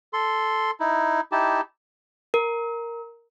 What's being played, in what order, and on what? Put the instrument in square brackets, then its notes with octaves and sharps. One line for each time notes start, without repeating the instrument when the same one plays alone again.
[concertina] A4 C6
D#4 E4
D#4 E4 G4 A5
[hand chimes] A#4